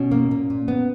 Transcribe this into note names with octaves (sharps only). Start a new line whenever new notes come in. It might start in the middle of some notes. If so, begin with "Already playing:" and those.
Already playing: B2 C#4
A#3
A#2
A#2
B3